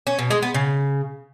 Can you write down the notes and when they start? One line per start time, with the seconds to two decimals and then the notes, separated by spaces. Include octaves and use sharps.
0.07 C#4
0.19 B2
0.31 G#3
0.42 B3
0.54 C#3